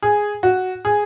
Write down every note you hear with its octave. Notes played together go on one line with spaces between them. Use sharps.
G#4
F#4
G#4